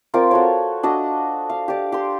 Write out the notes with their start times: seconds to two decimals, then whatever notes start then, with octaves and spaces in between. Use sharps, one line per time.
0.14 C4 F4 A#4 D5
0.31 F#4 A4 C#5
0.83 D4 F#4 D#5
1.50 F5
1.68 G4 D5
1.92 G4 C6